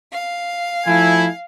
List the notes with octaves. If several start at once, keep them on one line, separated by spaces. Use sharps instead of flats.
F5
F3 A3 E4 G#5